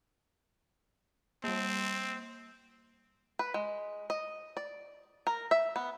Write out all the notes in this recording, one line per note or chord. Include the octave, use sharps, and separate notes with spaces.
G3 A#3 C4
B4
G#3
D#5
D5
A#4
E5
B3